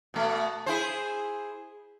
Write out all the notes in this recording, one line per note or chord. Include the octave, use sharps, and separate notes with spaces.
B2 A3
E4 G#4 C5